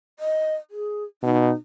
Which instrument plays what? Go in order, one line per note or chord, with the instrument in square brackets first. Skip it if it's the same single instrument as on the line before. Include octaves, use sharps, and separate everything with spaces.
[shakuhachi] D#5
G#4
[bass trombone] B2 [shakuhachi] D#4